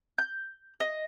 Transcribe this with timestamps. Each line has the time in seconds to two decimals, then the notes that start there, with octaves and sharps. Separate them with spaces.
0.18 G6
0.80 D#5